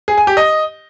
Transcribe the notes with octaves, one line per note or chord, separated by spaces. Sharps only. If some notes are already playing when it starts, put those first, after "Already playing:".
G#4
G#5
G4
D#5